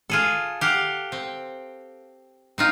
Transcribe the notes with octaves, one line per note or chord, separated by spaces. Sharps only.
F4 G#4 A4
G4 F5 F#5
C4
C4 D#4 F4